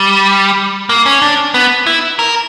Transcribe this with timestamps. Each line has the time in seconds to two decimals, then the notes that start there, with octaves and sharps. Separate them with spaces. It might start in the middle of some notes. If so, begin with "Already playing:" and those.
Already playing: G3
0.89 A#3
1.06 C#4
1.22 D4
1.54 B3
1.87 E4
2.19 A#4